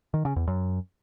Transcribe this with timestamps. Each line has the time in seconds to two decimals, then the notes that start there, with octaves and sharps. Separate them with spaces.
0.14 D#3
0.25 C#3
0.36 E2
0.47 F#2